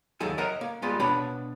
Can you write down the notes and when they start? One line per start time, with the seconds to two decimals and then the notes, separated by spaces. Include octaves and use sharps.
0.20 D#2 F#3 G#4 A4 G#5
0.38 A#4 C#5 D#5 E5 F#5 A#5
0.61 A#3
0.82 G3 G#3 A#3 B3 F4 G4
1.00 B2 B3 D4 C#5 B5